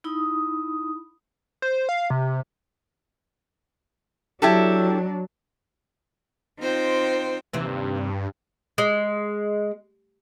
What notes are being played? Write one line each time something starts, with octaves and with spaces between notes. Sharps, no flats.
D#4 E4 B5 D#6
C5
F5
C3
F#3 D4 E4 G4 A4
C4 D#4 F4 C5 G5
D#2 C3 E3 C4
G2
G#3